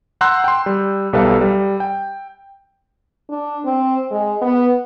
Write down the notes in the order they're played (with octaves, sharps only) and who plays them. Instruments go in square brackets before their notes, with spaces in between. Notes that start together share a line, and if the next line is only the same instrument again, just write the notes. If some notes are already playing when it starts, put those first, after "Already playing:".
[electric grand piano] F#5 A#5 C6 E6 F#6 G6
G5 C6
G3
B1 G3 A4 B4 E5 F5
G3
G5
[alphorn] D4
C4
G#3
B3